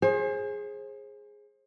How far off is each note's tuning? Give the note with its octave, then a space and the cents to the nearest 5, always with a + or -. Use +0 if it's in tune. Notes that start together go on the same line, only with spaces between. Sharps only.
G#4 +0 C5 +35